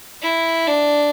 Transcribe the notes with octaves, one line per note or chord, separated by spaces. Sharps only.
E4
D4